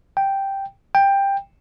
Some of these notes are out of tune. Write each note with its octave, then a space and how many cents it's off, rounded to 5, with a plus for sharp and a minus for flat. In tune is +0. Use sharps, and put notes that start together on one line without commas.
G5 +0
G5 +15